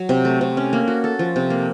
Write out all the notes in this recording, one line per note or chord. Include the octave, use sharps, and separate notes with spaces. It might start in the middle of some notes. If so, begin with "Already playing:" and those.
Already playing: F#3
C3
A3
C3
C#4
A#3
F#4
A4
F3
C3
A#3